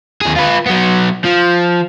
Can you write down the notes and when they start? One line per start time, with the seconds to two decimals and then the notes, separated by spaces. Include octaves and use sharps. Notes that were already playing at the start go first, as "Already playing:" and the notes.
0.21 D#2 G#4
0.36 F4 B4
0.67 F#3 B3
1.25 F3